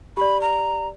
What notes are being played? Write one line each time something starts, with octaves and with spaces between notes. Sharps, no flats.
G4 D5 B5
A#5